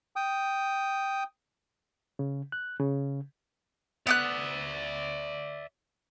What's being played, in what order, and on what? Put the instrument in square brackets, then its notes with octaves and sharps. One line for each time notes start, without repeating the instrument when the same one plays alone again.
[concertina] G5 D#6
[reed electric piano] C#3
F#6
C#3
[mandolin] B3 D6 F#6 [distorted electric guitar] D5 E5